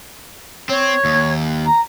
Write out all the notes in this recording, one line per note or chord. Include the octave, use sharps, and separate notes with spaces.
C4 C#5
D#2
A#5